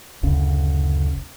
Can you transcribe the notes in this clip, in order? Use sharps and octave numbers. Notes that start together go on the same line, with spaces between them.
F#1 D2 C#3 C#4